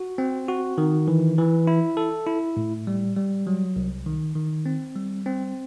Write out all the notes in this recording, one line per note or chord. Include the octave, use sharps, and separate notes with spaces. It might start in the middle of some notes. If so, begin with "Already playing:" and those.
Already playing: F#4
C4
F#4
D#3
E3
E3
E4
A4
E4
A2
G3
G3
F#3
C2
D#3
D#3
C4
G3
C4